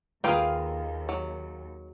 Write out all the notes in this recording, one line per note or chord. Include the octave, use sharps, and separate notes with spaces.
D#2 A#3 F4 G#4 B4 F5 G5
F#3